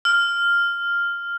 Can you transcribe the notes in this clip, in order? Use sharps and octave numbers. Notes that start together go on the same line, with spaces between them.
F6